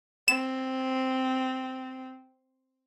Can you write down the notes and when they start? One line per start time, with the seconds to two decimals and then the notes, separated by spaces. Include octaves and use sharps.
0.28 C4 E7